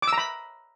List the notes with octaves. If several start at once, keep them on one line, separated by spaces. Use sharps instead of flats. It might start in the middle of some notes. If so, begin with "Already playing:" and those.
D6
E6
A#5
B5